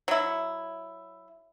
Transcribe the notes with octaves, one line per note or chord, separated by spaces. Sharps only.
F#3 E4